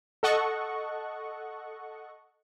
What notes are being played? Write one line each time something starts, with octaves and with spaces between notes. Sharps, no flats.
A4 D#5 F#5 C#6